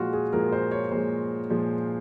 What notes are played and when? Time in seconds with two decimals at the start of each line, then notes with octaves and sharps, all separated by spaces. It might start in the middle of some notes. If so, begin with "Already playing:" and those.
Already playing: A#2 F3 G#3 F4 F#4
0.13 G#4
0.33 A#2 F3 G#3 A#4
0.52 C5
0.72 C#5
0.91 A#2 F3 G#3 C5
1.50 A#2 F3 G#3